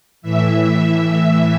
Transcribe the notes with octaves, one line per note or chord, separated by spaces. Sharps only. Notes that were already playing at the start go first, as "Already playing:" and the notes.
A2 E3 E5